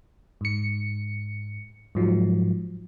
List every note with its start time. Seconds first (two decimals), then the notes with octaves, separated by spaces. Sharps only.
0.41 G#2 C#7
1.95 G#2 F3 F#3